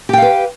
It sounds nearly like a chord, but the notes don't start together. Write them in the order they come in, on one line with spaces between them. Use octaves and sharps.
G4 G5 F5 B4